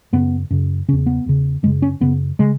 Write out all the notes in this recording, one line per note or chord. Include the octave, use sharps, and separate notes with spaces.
F#2 C#3 B3
F#2 C#3
E2 C#3 C#4
B3
E2 C#3
F#2 C#3 G#3
C#4
F#2 C#3 B3
C#3 G#3